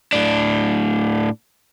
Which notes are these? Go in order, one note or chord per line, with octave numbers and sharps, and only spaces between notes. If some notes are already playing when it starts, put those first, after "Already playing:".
A2 D4